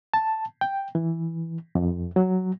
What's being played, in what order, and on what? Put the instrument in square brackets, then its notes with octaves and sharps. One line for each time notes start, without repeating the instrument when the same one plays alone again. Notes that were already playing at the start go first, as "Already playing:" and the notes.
[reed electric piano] A5
G5
E3
F2
F#3